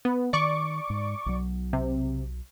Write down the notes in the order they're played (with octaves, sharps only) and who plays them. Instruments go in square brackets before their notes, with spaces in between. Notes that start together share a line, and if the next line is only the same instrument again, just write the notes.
[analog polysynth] B3
[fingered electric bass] D#3 [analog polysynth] D5 C#6 D6
[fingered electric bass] G#2
B1 F#3
[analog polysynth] C3